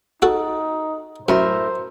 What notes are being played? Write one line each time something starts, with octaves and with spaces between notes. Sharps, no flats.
D#4 F#4 A4
F#2 A2 A#4 C5 E5